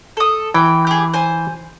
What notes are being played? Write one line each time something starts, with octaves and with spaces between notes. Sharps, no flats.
A4 D#6
E3 G5
G4 G#4
C5 G#5